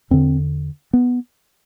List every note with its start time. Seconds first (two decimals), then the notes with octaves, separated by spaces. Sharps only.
0.11 E2 D3 C4
0.93 B3